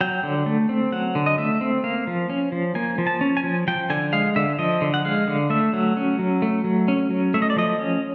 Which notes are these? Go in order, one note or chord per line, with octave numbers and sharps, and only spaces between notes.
F#3 G5
D3
A3
C4
F#3 F#5
D3
D#5
A3 E5
C4
A#3 F5
F3
C#4
F3
A#3 G#5
F3
A5
C#4
G#5
F3
F3 G5
D3 G#5
G#3 F5
D3 E5
F3 D#5
D3
F#5
G#3 F5
D3
A3 E5
F#3
C#4
F#3
A3
F#3
C#4
F#3
A3 E5
D#5
D5
F3 D#5
C#4